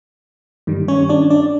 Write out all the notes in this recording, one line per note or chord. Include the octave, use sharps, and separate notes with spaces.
G2 D#3 G3
C#4 C#5
D4 D5
D4 D5